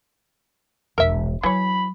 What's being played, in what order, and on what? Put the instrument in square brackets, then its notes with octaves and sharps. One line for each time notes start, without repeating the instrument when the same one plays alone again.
[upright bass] E1 A#1 [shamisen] A#4 E5
[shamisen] E3 C#5 [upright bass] F#3 [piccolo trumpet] B5